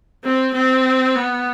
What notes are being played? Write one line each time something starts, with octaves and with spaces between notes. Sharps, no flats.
C4
C4
B3